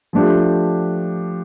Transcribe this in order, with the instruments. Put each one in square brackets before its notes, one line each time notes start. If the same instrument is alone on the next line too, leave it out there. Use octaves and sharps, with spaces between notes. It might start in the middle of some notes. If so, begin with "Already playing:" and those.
[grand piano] F3 A3 D4 G4